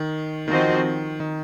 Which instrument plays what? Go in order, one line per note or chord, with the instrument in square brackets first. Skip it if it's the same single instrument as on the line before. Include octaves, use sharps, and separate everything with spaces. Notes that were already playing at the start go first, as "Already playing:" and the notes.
Already playing: [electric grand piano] D#3
[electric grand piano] D#3 [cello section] F3 C4 F#4 C5 D#5
[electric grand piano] D#3